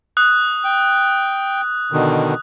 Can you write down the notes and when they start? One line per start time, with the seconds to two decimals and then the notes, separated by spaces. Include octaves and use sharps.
0.17 D#6 F#6
0.64 G5
1.92 B2 D3 D#3